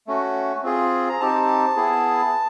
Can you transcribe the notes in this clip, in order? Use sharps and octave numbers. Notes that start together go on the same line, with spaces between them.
A3 C#4 F#4
C4 F4 G#4
A#5
C4 D#4 G4 A5
B3 E4 G#4